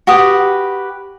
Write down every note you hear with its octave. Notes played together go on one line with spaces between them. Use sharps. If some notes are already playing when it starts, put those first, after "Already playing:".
F#4 G4 B4 D#6